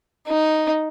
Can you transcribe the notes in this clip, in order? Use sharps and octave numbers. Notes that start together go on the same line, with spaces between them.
D#4